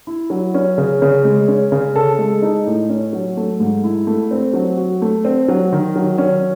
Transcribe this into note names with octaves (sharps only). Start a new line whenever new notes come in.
E4
F#3
C#4
C#3
C#3
G#3
C#4
C#3
A4
G#3
D#4
A2
C#4
F#3
A3
G#2
E4
A3
C4
F#3
F#4
A3
C4
F#3
D#3
F#3
C#4